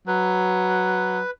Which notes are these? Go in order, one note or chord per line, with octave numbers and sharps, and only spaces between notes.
F#3 B4